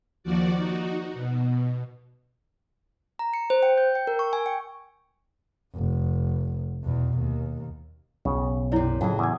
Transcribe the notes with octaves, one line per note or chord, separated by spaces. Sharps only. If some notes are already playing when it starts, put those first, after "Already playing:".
D#2 F3 F#4 D5
D#4 F#4
B2
A#5
C#7
C5
G5
G6
G5
A#4
C#6
G#5
G5
F1
E2 B2
D#2
B1 C#3
F#2 C3 E4 C#5 D5
F2 A2 C#3 F#3 G#4
E2 G#5